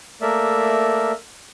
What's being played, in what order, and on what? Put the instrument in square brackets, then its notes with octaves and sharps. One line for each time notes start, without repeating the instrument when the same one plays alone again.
[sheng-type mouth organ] A3 A#3 A#4 D5 E5